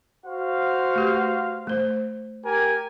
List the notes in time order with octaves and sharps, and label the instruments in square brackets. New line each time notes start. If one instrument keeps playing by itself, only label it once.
[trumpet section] F#4 C5 F5
[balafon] A3 G4 B4
A3 C5
[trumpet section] G4 A#4 G#5